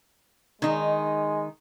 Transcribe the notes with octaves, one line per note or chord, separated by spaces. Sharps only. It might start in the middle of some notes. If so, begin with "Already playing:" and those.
D#3 G#3 D#4